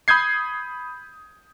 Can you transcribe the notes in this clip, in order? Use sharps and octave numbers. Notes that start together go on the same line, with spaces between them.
B5 D#6 G6 G#6 C7